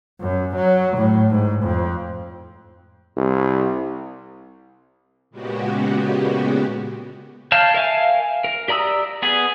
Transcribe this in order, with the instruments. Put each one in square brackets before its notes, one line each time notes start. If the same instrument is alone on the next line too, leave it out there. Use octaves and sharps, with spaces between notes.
[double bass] F#2
F#3
A2
G#2
F2
[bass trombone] C2
[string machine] A#2 C#3 G#3 B3 F#4 G4
[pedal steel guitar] C#5 F5 A5 F6 G6
A#4 E5 F5 G#5
A#4
G4 D5 A#5 D#6 E6
B3 G#4